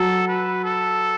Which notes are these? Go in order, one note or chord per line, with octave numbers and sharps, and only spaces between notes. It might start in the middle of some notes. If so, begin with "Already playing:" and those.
Already playing: F#3 A4
B4
A4